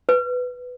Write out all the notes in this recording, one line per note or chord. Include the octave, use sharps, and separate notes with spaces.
B4